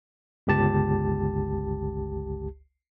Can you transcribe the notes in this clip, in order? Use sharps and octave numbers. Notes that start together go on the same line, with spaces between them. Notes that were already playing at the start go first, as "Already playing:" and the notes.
G1 C#2 G4 A5